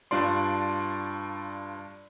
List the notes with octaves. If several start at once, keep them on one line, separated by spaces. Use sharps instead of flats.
G2 D4 F4 D5 C6